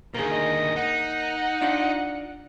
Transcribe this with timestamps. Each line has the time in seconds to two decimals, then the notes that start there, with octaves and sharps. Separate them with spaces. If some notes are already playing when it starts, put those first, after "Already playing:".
0.14 D2 D#3 A#3 G#4
0.32 D#5
0.77 D#4 F#5
1.61 D4 F4